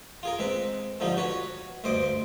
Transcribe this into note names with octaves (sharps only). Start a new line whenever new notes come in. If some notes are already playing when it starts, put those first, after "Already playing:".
F4 G#4 A#4
G#3 C4 B4
G#2 D3 F3 D#4 G4
F#4 B4 C#5
D2 G2 C5 D#5 D6